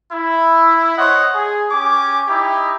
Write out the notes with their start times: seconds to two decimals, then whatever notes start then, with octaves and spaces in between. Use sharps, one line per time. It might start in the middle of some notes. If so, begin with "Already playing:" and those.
0.13 E4
0.98 C5 C#5 D#5 F#5
1.34 G#4
1.70 C#4 G4 G#5 D6
2.28 D#4 E4 G4